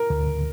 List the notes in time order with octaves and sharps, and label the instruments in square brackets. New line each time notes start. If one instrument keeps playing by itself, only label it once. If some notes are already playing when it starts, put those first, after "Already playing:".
Already playing: [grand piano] A#4
[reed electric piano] D2